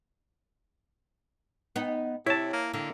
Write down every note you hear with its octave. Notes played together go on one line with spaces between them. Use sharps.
B3 D#4
C3 E4 C#5 A5
A#3
D3 A#3